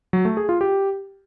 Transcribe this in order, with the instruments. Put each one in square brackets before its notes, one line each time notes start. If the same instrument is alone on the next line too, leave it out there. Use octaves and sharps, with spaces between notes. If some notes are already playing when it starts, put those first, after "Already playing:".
[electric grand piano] F#3
A3
G#4
F4
G4